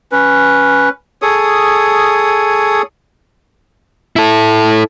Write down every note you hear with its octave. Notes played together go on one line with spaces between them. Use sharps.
C#4 B4
G#4 A4 C#5 D#6
E4 A4